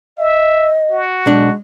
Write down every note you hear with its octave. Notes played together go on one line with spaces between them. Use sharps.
D#5 E5
F#4
B1 G#3 D4